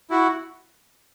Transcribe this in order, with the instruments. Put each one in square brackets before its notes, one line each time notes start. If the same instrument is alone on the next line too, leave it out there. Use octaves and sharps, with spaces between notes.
[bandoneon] E4 F#4